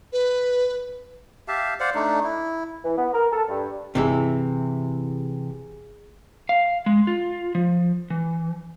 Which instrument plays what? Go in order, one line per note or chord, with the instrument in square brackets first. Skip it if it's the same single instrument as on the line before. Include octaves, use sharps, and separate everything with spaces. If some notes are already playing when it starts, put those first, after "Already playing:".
[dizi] B4
[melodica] G4 E5 F5 A5
C5 D5 F5 F#5
A3 D4 D#4
E4
[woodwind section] E3
B3
A#4
A4
G2
[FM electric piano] G1 G#4 [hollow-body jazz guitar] C3 E3 E4
[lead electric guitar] F5
G#3
F4
F3
E3